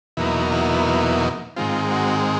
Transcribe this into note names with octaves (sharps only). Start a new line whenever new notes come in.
E2 B2 F#3 A#3 D#4 E4
E4
G#2 D#3 G#3 C4 F4
F#4